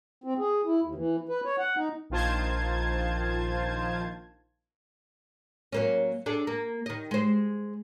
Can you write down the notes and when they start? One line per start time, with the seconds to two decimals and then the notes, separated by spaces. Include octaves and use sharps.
0.24 C4
0.39 G#4
0.65 E4
0.83 D#2
0.95 E3
1.29 B4
1.45 C#5
1.58 F#5
1.78 D#4
2.10 A#1 D#3 F4 C5 A5 G#6
5.73 F#3 A#3 C#4
6.26 D4 G#4 A4
6.47 A#3
6.86 D#3 D#5
7.11 G#3 C5